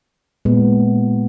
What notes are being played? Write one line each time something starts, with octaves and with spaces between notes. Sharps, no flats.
A#2 G#3 B3